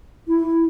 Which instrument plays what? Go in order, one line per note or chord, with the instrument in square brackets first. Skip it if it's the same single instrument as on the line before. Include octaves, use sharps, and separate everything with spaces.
[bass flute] E4